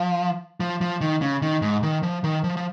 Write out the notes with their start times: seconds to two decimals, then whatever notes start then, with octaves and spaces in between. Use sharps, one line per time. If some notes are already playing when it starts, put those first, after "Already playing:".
Already playing: F3
0.60 F3
0.81 F3
1.01 D#3
1.21 C#3
1.42 D#3
1.62 G#2
1.83 D#3
2.03 F3
2.24 D#3
2.44 F3
2.57 F3